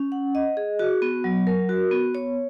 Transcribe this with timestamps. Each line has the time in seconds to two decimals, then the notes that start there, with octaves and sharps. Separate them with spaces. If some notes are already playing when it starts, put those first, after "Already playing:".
Already playing: C#4
0.12 F#5
0.35 D#5
0.57 G#4
0.79 F#4
1.02 B3
1.24 F#3
1.47 A#4
1.69 F#4
1.91 B3
2.15 C#5